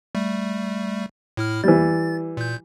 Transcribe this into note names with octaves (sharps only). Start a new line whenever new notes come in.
G3 A3
A2 E4 F6
E3 G3 A6
A#2 G6